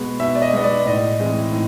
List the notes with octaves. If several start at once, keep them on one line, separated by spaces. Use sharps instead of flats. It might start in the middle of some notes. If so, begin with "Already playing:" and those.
Already playing: B2 G#3 B3
B2 E5
D5
D#5
G#3 B3 D#5
D5
A2 D#5
E3 G#3 C4
A2